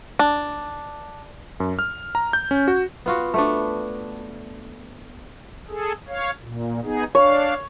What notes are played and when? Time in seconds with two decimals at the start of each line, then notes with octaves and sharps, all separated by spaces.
0.19 D4
1.60 F#2
1.79 F6
2.15 A#5
2.33 G6
2.51 C#4
2.68 F#4
3.06 B3 F4 F#4
3.34 A3 B3 D4
5.69 G#4 A4
6.08 C#5 F5
6.41 A#2
6.83 B3 D#4 G#4
7.15 D4 C#5 F5